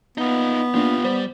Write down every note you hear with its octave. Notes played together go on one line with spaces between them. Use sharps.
B3 D#4 F4
A#3 D4 F4 G4
G3 C5